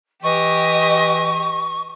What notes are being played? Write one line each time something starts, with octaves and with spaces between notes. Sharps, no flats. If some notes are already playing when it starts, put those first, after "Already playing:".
E3 G4 D#5 C#6